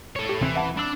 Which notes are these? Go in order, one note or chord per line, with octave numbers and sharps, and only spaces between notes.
A4 C#5
G4
D#1 C3 E3 C4
E5 F#5 A5
D4 D5 B5 E6